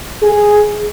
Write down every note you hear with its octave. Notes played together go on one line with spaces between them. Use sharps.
G#4